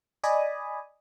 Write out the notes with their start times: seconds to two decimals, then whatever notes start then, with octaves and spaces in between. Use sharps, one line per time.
0.24 D5 D#5 G#5 B5 D#6